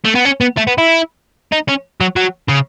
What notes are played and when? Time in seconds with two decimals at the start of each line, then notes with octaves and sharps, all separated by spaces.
0.05 A3
0.15 B3
0.25 C#4
0.41 B3
0.57 A3
0.67 B3
0.78 E4
1.52 D#4
1.69 C#4
2.01 F#3
2.16 F#3
2.48 C#3